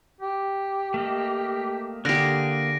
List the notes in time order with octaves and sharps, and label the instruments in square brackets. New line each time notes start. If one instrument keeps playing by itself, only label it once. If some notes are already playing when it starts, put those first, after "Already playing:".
[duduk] G4
[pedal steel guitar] A3 A#3 D#5
[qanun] D3 G4 [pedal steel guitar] A#3 G#4 [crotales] F#6 A#6 D7